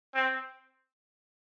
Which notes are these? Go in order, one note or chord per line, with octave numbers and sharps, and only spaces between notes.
C4